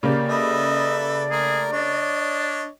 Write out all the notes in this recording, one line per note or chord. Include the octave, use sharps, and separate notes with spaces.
C#3 A#3 G4 D5
A4 B4 D#5 E5
A3 G#4 A#4
D4 C#5 D#5